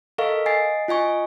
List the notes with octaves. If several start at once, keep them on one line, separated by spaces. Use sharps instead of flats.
A4 A#4 D#5 F5 C#6
D#5 G#5 A6 C7
F4 D#5 G#5 C#6